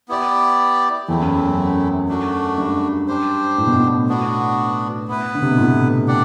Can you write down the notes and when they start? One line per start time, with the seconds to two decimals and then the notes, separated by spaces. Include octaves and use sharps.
0.08 B3 E4 G4 D5
1.08 E2 A3 C4 E4
1.21 F#2
1.33 F#2
1.45 F#2
2.08 A3 D4 F#4
2.58 G2
3.08 D4 G4 C5
3.58 A2
3.67 B2
3.74 A2
4.08 B3 D4 F#4
5.08 B3 E4 B4
5.35 D3
5.42 C3
5.50 B2
5.58 A2
6.07 D4 G4 D5 F#5